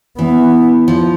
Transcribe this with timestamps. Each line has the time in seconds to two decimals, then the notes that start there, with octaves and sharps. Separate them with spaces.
0.19 E3 B3
0.88 F3